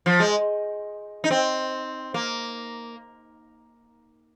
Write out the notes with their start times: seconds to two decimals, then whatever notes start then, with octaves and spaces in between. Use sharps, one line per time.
0.06 F3
0.20 G#3
1.24 D#4
1.31 C4
2.14 A#3